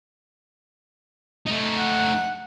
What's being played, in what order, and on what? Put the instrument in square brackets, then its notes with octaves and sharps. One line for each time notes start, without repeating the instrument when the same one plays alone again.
[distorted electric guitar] A3 D#4
[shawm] F#5